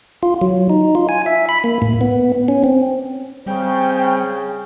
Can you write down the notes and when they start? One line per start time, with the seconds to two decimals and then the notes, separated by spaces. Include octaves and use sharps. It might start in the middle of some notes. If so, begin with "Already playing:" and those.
0.23 F4
0.41 F#3
0.70 D#4
0.95 F4
1.09 G#5
1.26 E5
1.49 B5
1.64 A#3
1.82 A2
2.01 B3
2.48 C#4
2.64 C4
3.46 C#3 G3 C4 G5